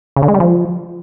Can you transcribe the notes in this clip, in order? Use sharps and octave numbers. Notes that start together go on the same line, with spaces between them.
C#3
D3
G#3
G3
F3